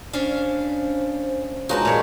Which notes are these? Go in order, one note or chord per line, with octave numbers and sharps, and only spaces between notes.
C#4 D4 C5 F5
F3 F#3 G#3 D#4 F#4 G#4 B4 A5
A#2 G#3 G4 C#5